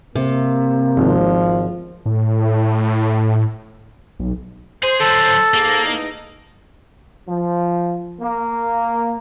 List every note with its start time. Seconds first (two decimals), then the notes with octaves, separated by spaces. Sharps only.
0.16 C3 A#3
0.97 G#1 F3
2.06 A2
4.20 B1
4.83 G#4 C5
5.00 D3 F#3 A4
5.54 G#2 A#3 A#4 D6
5.82 E2 D#4
7.26 F3
8.20 A#3